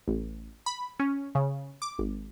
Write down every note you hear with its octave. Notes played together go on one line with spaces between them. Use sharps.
A1
B5
C#4
C#3
D6
G#1